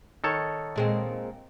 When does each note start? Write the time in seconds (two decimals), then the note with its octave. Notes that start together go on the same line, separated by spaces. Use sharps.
0.24 D#3 A4 C#5
0.76 A#2 G#3 C4